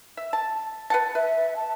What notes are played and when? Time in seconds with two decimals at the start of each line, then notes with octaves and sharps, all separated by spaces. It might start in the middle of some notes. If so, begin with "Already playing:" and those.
0.17 E5
0.33 A5
0.90 B4 F#5 A5
1.15 B4 E5
1.56 A5